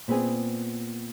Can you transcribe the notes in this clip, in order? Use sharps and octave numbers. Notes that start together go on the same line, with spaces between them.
A#2 B3 C4 G#4